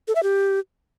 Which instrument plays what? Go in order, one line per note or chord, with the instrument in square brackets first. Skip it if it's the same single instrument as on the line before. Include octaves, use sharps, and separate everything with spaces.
[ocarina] A4
E5
G4